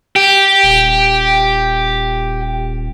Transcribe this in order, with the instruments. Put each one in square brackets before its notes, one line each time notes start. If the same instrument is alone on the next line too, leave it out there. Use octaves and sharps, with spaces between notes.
[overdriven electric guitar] G4
[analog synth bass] D#1